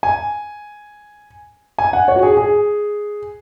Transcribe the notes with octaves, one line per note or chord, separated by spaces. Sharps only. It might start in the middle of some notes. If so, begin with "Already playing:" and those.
G#5
G#5
F#5
C#5
F#4
G#4
G#4